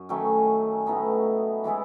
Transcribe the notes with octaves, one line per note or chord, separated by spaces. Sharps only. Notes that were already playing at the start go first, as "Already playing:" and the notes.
Already playing: F#2
D#3 F#3 A3 C#4
A2 F#3 B3 D#4
E3 G#3 B3 E4